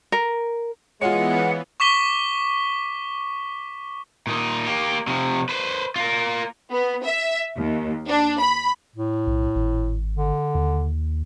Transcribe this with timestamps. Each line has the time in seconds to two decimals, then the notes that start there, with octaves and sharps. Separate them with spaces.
0.12 A#4
1.01 E3 G#3 B3 F4 C#5 F#5
1.80 C#6 D6 B6 G7
4.27 A#2 D#4
4.66 A#3 G4
5.07 C3 F3
5.49 B4 C5
5.96 F4 A#4
6.71 B3
7.04 E5
7.57 D#2
8.08 D4
8.40 B5
8.96 A2
9.27 B1
9.56 G#1
10.15 D3
10.55 D#2